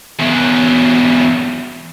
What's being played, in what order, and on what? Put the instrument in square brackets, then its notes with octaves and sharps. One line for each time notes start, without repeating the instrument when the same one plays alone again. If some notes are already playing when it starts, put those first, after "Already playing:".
[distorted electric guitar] E2 F#3